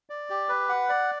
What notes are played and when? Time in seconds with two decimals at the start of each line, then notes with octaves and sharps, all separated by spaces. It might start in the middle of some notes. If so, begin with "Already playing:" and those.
0.10 D5
0.30 G4
0.49 B4
0.69 F#5
0.89 D5